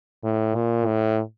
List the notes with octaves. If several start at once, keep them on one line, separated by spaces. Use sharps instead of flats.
A2
A#2
A2